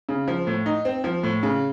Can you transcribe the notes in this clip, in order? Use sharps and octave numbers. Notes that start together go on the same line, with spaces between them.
C#3
F3
A2
D#4
C4
F3
A2
C#3